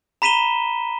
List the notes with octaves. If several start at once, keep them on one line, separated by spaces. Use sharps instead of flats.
A#5 B5 B6 D#7 E7 G7